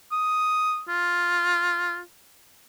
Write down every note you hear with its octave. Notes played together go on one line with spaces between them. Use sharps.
D#6
F4